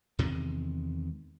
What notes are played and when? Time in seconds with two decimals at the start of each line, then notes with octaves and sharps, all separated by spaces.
0.19 E2 C3 D#3 G#3